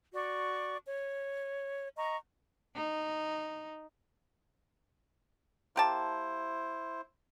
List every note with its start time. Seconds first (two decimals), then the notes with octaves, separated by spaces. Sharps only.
0.13 F#4 D5 C#6
0.85 C#5
1.96 D#5 A#5 C#6
2.75 D#4
5.76 A#3 E4 G4 C5 A5